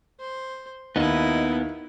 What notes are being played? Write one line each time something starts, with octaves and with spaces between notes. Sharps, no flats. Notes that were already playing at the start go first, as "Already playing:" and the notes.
C5
D#2 B3 D#4 E4 D#5